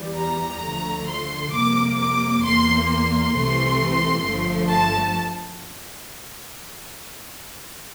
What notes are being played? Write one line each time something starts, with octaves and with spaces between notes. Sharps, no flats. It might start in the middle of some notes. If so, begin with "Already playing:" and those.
Already playing: E2 E3 G3
A#5
D2 D3 F3 A3
C6
F2 C3 G3 A#3 D6
D6
E2 E3 A#3 C6
C6
C2 C3 E3 A3
G1 G2 F3 A3
A5